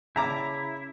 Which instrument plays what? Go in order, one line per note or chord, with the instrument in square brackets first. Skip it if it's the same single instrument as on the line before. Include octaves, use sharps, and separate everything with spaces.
[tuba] C#3 [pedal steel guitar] E4 [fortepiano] A5 A#5 D6